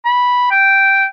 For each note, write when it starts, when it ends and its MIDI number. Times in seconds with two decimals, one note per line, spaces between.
0.05 0.47 83
0.51 1.06 79